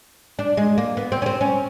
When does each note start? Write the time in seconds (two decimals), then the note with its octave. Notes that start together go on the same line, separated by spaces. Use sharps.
0.39 D4
0.57 G#3
0.78 A#3
0.97 B3
1.12 C4
1.22 C#4
1.26 C4
1.41 C#4